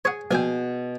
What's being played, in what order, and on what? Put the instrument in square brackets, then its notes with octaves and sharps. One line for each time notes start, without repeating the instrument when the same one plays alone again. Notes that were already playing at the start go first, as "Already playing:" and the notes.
[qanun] G#4 [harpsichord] C#5 F#5
[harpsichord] A#1 G5 [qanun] B2 G#5